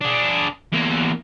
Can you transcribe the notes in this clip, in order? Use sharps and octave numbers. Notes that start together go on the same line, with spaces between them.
D4 G#4
E2 A#3